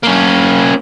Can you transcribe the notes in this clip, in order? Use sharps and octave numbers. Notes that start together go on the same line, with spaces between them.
A#3 C#4